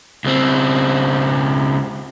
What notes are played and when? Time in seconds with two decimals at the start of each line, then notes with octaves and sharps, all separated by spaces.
0.24 C#2 C4